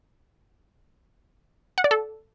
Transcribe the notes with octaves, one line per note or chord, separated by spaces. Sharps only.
F#5
D5
A4